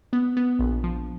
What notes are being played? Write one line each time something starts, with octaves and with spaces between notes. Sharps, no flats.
B3
B3
A#1
F3